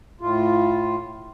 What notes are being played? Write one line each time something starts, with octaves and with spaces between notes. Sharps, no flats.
A2 F4